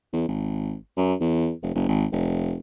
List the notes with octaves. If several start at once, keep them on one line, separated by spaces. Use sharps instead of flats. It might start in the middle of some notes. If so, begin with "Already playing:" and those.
E2
G#1
F#2
E2
F1
F#1
G#1
F1